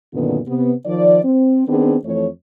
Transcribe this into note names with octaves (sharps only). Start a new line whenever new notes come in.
F#2 A#2 D3 D#3 B3
C3 B3
D#3 F3 D5
C4
D#3 B3 C4 D4 G#4
F2 E3 A3 C#5